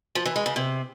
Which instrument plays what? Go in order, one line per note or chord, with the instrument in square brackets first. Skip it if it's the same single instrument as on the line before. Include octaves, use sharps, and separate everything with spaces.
[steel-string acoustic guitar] F3
E3
G#3
C#3
C3